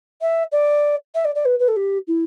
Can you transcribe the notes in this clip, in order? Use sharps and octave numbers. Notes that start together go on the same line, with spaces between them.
E5
D5
E5
D5
D5
B4
B4
A4
G4
E4